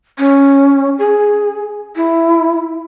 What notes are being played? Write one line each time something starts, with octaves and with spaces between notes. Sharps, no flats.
C#4
G#4
E4